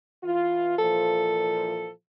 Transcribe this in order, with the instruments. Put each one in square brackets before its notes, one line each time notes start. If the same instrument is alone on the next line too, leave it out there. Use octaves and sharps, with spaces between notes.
[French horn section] E3 F4
[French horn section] A#2 E3 F3 [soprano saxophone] A4